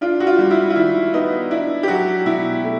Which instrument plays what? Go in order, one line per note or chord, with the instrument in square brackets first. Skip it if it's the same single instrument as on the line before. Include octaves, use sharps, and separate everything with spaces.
[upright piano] D4 F4
F#4
F4
G3
E4
F4
D#3 E4
B3 D#4
D4 E4
G4
F#3 F#4
B2 E4
A3